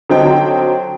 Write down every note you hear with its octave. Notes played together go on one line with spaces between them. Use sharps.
D3 F#3 C4 D#4 G5